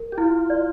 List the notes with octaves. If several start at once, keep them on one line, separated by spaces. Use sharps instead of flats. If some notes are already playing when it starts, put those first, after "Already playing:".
Already playing: A#4
G4
E4 F4
D5